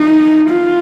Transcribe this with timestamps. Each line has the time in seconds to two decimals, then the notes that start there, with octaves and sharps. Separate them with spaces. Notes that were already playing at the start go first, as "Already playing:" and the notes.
Already playing: D#4
0.50 F4